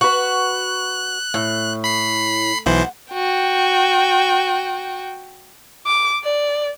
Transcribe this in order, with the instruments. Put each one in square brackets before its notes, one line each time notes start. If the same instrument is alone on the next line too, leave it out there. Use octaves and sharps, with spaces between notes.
[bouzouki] F#4 B4 [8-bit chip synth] F#6
[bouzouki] A2
[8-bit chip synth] B5 C7
[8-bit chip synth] B1 E3 C5 [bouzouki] F#5
[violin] F#4 G5
[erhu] D6
D5